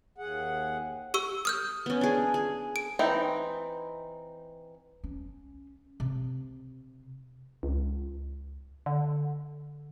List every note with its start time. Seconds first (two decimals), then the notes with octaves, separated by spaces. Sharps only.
0.18 D#2 G#4 F#5
1.14 G4 C#6 E6
1.45 D#6 F6 G6
1.86 B3 C#4
2.01 D4 G#4
2.34 G#4
2.76 D7
2.99 E3 C4 D#4
5.04 C#4
6.00 C3
7.63 C#2
8.86 D3